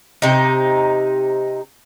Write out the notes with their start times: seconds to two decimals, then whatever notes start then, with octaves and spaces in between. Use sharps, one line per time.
0.22 C3 D#4